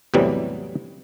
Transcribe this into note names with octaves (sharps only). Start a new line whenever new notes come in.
E2 A2 C3 E3 F#3 G3